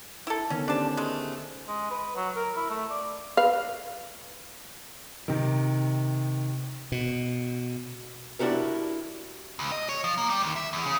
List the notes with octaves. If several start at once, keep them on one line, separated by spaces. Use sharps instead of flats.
E4 A4
D3 D#3 B3 C#4
C#4 D4 G4 C5 A5
G#3 A3
G#3
B4
F#3
A#4
E4
A3
D5
B4 F5
C3 D#3
B2
D4 E4 F#4 G4 A#4
C#2
D#5
C#5
F3
A#3
G3
D#2
E5
E2
C#3